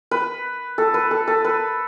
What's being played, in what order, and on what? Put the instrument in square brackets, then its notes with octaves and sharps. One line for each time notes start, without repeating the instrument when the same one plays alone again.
[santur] B4
A4
B4
A4
A4
B4